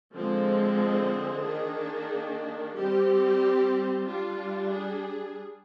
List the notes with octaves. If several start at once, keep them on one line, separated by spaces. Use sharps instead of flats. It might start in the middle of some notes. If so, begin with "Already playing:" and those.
D3 F3 G#3 C4
G#4
D#3 A#3 D4
G3 C4 G4
G3 D4 F4
G#4